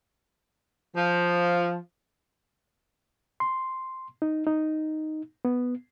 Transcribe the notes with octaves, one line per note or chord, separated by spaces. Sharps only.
F3
C6
D#4
D#4
B3